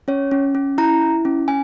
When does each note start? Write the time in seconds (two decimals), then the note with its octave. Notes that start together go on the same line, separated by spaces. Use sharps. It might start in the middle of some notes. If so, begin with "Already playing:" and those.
0.08 C#4 C#5
0.31 C#4
0.55 C#4
0.78 E4 A#5
1.02 E4
1.25 C#4
1.48 C#4 G#5